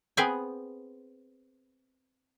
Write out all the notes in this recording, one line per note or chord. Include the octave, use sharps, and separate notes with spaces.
B3 C4 G#4 B4 G5 G#5